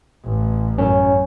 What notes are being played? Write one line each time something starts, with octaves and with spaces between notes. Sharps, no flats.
A1
F#2 C#4